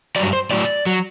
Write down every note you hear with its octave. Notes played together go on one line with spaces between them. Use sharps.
G2 F#3 D5
C5
A2 F#3 D5
F#3